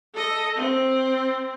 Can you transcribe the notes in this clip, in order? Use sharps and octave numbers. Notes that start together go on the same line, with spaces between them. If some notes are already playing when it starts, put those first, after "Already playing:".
A4 D#5
C4